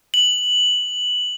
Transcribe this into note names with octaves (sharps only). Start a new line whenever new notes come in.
F#7